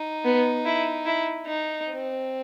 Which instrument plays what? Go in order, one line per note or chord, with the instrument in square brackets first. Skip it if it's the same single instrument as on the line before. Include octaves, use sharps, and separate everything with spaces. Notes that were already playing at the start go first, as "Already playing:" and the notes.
Already playing: [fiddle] D#4
[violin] B3
E4
E4
D#4
[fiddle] C4